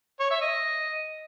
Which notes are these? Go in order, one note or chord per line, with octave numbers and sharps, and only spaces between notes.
C#5
E5
D#5